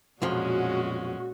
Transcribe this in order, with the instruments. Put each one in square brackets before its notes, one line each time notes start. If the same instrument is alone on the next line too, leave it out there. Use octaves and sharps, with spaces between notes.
[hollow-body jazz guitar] B1 F2 F3 [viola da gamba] A#2 G#3 C#4 [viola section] F#4